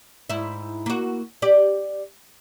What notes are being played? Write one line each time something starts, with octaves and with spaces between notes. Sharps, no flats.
G#2 E4
A#3 F#4
G4 D5